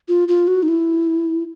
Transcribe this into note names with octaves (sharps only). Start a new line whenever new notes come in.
F4
F4
F#4
D#4
E4